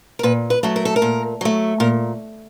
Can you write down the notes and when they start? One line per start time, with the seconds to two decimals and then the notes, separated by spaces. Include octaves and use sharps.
0.19 A#4
0.23 A#2 B4
0.50 B4
0.63 F#3 A3
0.76 A#4
0.85 A4
0.96 A#4
1.02 A#2
1.41 F#3 A3
1.80 A#2 A#4